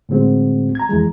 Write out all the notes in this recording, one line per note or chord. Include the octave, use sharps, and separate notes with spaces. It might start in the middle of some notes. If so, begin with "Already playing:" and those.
A2 D3 G#3 C4 F#4
A#5 G#6
F2 E3 G#3